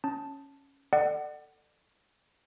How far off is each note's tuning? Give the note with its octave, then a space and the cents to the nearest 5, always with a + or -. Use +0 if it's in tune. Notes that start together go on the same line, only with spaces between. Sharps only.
C#4 +0 A5 +0
A4 +20 D5 +35 F#5 +20